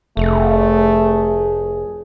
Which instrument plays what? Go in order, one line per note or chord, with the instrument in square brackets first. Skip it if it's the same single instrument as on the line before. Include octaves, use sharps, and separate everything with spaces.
[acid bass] F1 [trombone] A3 [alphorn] G#4